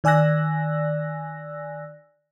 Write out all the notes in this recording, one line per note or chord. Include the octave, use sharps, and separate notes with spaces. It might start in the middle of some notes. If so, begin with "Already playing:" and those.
D#3 D5 G#5 E6 F#6 A#6